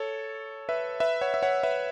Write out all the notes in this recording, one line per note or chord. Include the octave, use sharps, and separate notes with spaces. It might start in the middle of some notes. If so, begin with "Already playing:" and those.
Already playing: A4 C#5
B4 E5
B4 E5
C#5 F#5
E5
C#5 F#5
B4 E5